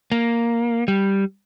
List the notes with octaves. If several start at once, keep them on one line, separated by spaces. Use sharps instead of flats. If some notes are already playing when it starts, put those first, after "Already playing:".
A#3
G3